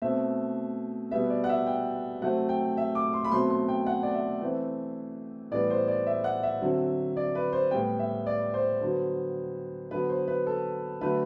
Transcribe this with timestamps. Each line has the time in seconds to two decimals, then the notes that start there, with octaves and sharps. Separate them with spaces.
0.02 B2 A3 C4 E5
1.11 B2 G3 B3 E5
1.30 D5
1.44 F#5
1.49 E5
1.67 G5
2.21 C3 F#3 A3 C4 F#5
2.49 G5
2.77 E5
2.95 D6
3.13 C6
3.25 B5
3.32 B2 F#3 A3 C4 C6
3.50 C6
3.68 G5
3.86 F#5
4.03 D5
4.14 E5
4.41 E3 A3 C4
5.51 A2 E3 G3 B3 D5
5.70 C5
5.88 D5
6.07 E5
6.24 F#5
6.43 E5
6.62 D3 F#3 C4
7.17 D5
7.35 B4
7.53 C5
7.71 A2 G3 B3 G5
7.99 E5
8.26 D5
8.54 C5
8.81 D3 F#3 B3
9.91 D3 F#3 B3 B4
10.09 C5
10.28 B4
10.47 A4
11.01 D3 F#3 A3 B4